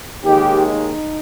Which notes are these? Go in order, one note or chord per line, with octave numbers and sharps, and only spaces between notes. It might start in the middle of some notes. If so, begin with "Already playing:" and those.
D#2 D#3 G#3 G4
D#4